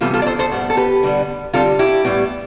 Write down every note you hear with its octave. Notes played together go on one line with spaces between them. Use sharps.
C3 E3 G3 B3 F4 A4
F4 A4
D5
A4 C5
A4 C5
A2 G3 B3
A4
G4 B4
D3 G3 B3
D3 G3 C4 F4 A4
E4 G4
A2 G3 B3